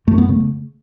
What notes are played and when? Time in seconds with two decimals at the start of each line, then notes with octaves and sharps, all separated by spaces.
0.07 F#2 A3
0.18 B3
0.29 C#3 A3